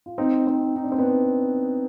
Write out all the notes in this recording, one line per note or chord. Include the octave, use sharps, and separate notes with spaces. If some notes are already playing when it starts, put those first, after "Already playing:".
F4
C4 D#4
C4 D#4
D#4
D4
C4
B3 D4